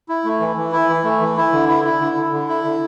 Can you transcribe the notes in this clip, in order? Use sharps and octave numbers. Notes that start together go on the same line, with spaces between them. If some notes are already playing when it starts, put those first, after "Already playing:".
E4
A3
E3
E3
E4
E3
A3
E3
E4
D3
E4
E4
D3
D3
D3
E4
D3